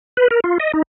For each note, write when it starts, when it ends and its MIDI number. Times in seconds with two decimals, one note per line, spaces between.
0.17 0.28 71
0.31 0.40 70
0.44 0.58 65
0.60 0.72 75
0.74 0.82 63